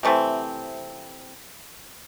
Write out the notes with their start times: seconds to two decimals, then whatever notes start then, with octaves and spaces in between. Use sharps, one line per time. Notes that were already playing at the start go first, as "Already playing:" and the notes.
0.03 C3 E3 A3 C4